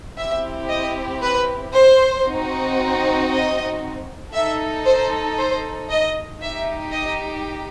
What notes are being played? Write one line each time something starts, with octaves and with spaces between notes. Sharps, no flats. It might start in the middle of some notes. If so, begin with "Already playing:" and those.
C4 E4 G4 E5
D#5
B4
C5
C4 D#4 F#4
D#5
D#4 A4 E5
C5
C5
D#5
D#4 G4 E5
D#5